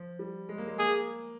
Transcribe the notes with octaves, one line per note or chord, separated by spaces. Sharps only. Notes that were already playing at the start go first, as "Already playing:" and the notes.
Already playing: F3
G3
G#3
A#3
G#3
A#3 G#4